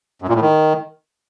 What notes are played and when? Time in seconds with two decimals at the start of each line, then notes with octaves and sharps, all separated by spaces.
0.22 F#2
0.28 A#2
0.35 A2
0.41 D#3